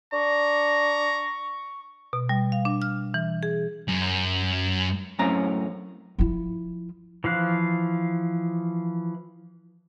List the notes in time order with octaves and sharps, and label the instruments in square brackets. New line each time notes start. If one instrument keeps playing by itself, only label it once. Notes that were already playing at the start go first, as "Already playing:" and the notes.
[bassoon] D4 [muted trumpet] A#5 [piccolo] C#6
[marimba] B2
G3
F5
D4
F6
E3
G#4
[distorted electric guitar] F#2
[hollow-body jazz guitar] F#2 A2 C4 C#4 A#5
[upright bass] F3 E4
[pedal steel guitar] E3 F3 F5 F#6